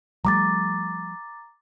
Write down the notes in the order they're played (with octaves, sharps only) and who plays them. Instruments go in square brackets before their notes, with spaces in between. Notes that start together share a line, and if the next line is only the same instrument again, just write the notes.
[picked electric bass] F3 G3 A3 [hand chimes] A#5 D6 A6